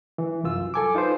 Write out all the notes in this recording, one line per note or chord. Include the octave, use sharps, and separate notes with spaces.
E3
C2 F#2 F4 E6
A4 G#5 D6
D#4 F4 B4 C5